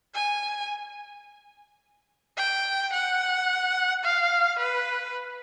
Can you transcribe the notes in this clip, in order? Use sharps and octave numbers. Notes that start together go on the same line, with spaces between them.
G#5
G5
F#5
F5
B4